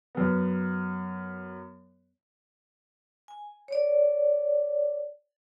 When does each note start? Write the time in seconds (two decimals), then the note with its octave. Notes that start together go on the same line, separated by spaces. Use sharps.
0.15 F#2 B3
3.28 G#5
3.68 C#5 D5